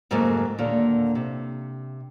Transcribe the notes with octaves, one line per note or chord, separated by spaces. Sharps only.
F2 G#2 C#3 F#3 A3 A#3
D#2 A#2 D3
C3